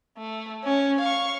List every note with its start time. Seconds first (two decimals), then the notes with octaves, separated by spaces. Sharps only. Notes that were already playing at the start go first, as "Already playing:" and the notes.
0.18 A3
0.64 C#4
1.00 F5 C#6